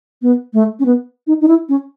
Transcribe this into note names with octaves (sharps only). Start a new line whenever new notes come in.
B3
A3
C#4
B3
D#4
D#4
E4
C#4